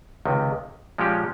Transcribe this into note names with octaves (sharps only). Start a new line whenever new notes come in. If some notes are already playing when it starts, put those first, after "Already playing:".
C#2 C3 D#3
A#2 F3 G#3 C#4 G4